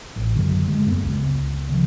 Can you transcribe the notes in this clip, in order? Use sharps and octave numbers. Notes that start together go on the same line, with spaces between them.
A1
F#2 D3
G#3
F1 F#2 B3
C#2
C#3 F3